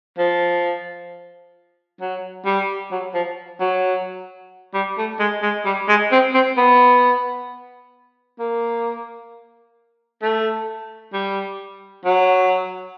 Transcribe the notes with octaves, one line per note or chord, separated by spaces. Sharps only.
F3
F#3
G3
F#3
F3
F#3
G3
A3
G#3
G#3
G3
G#3
C4
C4
B3
A#3
A3
G3
F#3